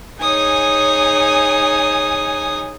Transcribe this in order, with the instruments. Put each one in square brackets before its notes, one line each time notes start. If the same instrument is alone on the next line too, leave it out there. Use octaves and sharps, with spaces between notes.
[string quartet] D#4 G#4 C#5 [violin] G#5 D#6